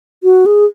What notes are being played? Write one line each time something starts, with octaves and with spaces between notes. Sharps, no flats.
F#4
G#4